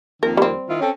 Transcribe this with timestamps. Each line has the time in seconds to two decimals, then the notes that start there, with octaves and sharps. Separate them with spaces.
0.23 F2 D#3 A#3 A#4
0.37 G3 C4
0.69 D#3 E4 F4
0.80 C4 C#4 A4